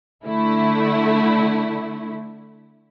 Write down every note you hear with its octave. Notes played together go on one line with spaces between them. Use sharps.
D3 A3 E4